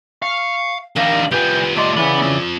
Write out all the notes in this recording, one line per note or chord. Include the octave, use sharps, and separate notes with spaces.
F5 C#6
D#3 G3 D4 A#4 F5 A#5
C2 G3 F4 B4 G5 G#5
A3 D5 D#5 C6
C#3 E3 B3 B5
C4 F4